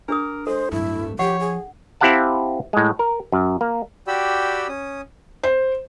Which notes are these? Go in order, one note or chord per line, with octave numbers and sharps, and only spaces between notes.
D4 G#4 A#4 D#6
G#3 A4 C5
D1 G2 A3 E4
F3 G4 C#5 F#5
G#4
C4 E4 G4 F5 F#5 A5
A2 G#3
A#4
F#2
A#3
F#4 G4 D5 G5 B5 E6
C#4 D#6
C5